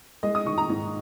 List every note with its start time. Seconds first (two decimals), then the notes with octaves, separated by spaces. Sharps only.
0.23 G#3 D#5
0.35 D#6
0.46 D#3 C#6
0.58 A#5
0.70 G#2